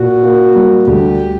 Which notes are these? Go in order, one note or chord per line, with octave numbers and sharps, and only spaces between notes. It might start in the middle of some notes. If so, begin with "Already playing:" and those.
Already playing: A#2 F#4
A#3
G3
D2 G4